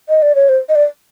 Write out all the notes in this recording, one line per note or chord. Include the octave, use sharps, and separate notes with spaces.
D#5
D5
C#5
C5
D#5
D5